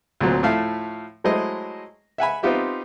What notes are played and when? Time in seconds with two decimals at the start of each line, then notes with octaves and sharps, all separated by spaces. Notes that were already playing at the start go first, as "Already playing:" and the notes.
0.21 D2 A#2 F#3 C4
0.43 A2 F3 A3 E5 F5
1.24 F#3 G#3 A3 E4 C5 D#5
2.18 E5 F#5 G#5 B5
2.43 B3 C4 D#4 F4 G4 E5